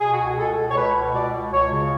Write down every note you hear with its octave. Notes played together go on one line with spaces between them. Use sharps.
B2 G#4
F#4
C#2
G#4
B2 A4
C#2
C#5
B2 B4
C#2
B2 D5
C#2
C#2 C#5
C#3